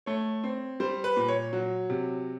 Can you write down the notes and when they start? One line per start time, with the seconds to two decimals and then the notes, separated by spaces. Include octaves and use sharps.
0.06 A3 C#5
0.44 C4
0.80 G3 C5
1.04 B4
1.17 A#2
1.28 C#5
1.53 F#3
1.90 C3